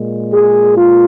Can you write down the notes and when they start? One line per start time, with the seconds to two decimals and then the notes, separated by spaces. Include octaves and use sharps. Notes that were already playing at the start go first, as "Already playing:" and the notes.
Already playing: A#2 G#3
0.33 G#4
0.77 F4